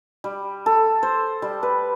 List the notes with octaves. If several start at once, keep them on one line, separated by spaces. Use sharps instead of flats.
G3
A4
C5
G3
B4